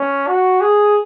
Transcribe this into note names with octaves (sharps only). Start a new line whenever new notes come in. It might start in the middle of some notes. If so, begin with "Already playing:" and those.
Already playing: C#4
F#4
G#4